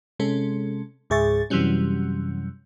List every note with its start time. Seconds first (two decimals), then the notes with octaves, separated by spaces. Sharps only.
0.19 C3 G#3 C#4 A4
1.10 C#2 G#2 G#4 E5 C#6 A6
1.50 F#2 C3 E3 F#3 G3 C#4